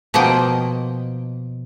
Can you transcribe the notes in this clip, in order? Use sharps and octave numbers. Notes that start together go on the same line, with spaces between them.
B2 F3 A#3 D#5 G5